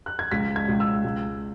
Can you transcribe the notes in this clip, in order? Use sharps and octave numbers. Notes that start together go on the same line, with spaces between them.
F#6
G#6
C#2 B6
G#6
C#2
E6
C#2